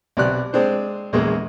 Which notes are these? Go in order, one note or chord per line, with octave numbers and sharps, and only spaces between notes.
B1 C3 D5 F#6
G#3 C4 D4 C5
A#1 E2 G#3 A#3